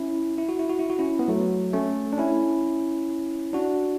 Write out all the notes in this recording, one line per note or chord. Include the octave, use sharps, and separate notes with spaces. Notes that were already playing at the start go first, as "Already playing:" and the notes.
Already playing: C#4 E4
E4
F#4
E4
F#4
E4
F#4
C#4 E4
B3
F#3 A3
A3 C#4
D4
C#4 E4
D4 F#4